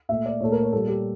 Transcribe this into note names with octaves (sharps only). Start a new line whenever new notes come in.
A#2 A3 E5
D5
A#2 A3 C#5
A#4
C#5
A#2 G3 A#3 A4
G4